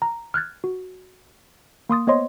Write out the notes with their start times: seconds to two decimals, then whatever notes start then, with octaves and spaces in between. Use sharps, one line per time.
0.02 A#5
0.34 F6 F#6 G#6 A6
0.64 F#4
1.89 A#3 C6 D#6 A6
2.07 B3 C5 C#5 D#5 C6